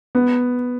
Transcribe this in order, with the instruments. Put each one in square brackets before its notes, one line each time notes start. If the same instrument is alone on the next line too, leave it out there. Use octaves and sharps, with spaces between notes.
[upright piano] B3